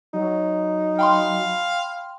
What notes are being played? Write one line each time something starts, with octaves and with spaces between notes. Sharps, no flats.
F#3 D#4
F5 G5 B5 C6